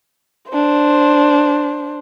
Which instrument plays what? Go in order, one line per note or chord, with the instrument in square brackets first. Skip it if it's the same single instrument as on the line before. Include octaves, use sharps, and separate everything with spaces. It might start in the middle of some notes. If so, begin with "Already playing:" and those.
[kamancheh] D4 C5